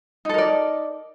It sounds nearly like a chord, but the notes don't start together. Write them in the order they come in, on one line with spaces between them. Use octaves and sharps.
D#4 A4 A#4 D5